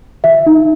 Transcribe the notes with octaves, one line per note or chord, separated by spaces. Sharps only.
E5
D#4